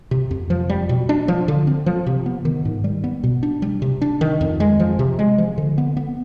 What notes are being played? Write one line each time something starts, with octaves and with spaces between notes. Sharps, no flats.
C3
F2
F3
G3
B2
D4
F3
D3
C4
F3
C3
B3
D#3
G#2
G3
B3
B2
D4
G3
C3
D4
D#3
F2
G#3
F3
C3
G#3
F3
D3
B3
B3